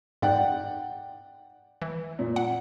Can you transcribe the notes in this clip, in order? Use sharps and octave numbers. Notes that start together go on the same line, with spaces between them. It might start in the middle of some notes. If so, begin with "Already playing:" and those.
G#2 D5 F#5 G5
E3
A#2
F#5